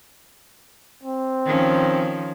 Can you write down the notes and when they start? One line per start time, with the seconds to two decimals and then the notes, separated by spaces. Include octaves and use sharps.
1.03 C4
1.46 D#3 F3 C#4